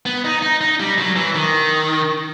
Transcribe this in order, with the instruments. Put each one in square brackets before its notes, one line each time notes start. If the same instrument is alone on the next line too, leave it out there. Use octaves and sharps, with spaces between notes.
[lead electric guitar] B3
D#4
D#4
D#4
G3
F#3
E3
D#3